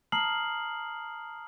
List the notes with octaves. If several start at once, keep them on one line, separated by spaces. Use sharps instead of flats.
A5 A#5 D#6 F6 C7 F#7